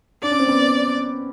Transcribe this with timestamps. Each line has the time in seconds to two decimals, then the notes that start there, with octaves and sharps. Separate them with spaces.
0.23 D4 D5
0.31 C#4
0.39 C4
0.48 B3 C#4